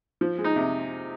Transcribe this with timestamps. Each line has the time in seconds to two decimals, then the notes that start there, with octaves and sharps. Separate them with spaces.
0.21 F3
0.38 G#3
0.44 D#4
0.56 C3